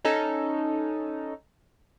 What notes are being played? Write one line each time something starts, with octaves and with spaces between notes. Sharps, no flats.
C#4 D#4 A4